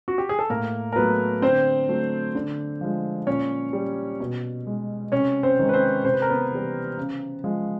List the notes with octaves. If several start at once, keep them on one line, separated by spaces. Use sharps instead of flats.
F#4
G4
G#4
A4
A2 A#3 A#4
A#4
F#3 A3 B3 B4
D3 C4 C5
F#3 A3
D3
F3 G#3
A#2 C#4 C#5
G3
B2
G#3
C3 C#4 C#5
C4 C5
D#3 G#3
B4
C4 C5
C3 C5
B4
A#4
B3 B4
E3 G3
C#3
F3 G#3